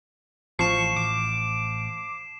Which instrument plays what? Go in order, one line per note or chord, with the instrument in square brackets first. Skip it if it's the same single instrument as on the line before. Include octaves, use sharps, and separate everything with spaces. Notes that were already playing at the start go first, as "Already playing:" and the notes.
[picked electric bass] A1 [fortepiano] F3 [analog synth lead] C#6 [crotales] C7 E7
[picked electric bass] A1 [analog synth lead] D6